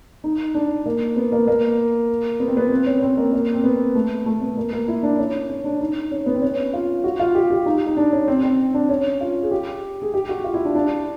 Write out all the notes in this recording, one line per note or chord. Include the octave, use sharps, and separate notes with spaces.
D#4
D4
A#3
B3
A#3
A#3
B3
C4
B3
C4
C#4
C4
A#3
A#3
C4
B3
A3
A3
B3
A#3
A#3
E4
D4
C#4
C#4
D4
D#4
C#4
B3
C4
C#4
F4
F#4
F4
G4
G4
D#4
D#4
D4
C#4
C4
C4
D4
C#4
F4
G#4
G4
G#4
G4
F#4
F4
E4
D4
D4